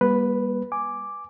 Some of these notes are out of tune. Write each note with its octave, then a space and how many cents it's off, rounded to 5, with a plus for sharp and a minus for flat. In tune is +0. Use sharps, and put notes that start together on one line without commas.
G3 +20 A#3 +45 B4 +0
G#5 +0 D6 +0